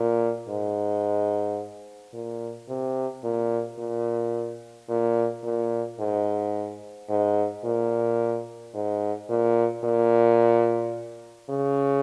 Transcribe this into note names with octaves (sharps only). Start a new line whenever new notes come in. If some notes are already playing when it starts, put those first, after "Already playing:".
Already playing: A#2
G#2
A#2
C3
A#2
A#2
A#2
A#2
G#2
G#2
A#2
G#2
A#2
A#2
C#3